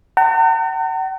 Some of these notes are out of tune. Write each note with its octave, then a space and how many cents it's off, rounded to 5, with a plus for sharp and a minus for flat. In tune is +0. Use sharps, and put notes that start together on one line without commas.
F#5 +40 A#5 -45